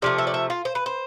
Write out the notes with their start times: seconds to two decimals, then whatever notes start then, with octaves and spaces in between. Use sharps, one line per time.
0.02 C3 F3 A3 D5
0.18 E5
0.27 D5
0.34 E5
0.50 F4
0.65 C5
0.75 B4
0.86 C5